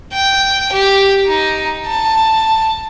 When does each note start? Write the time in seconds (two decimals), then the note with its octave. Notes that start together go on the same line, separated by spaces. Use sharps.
0.13 G5
0.72 G4
1.27 D#4
1.86 A5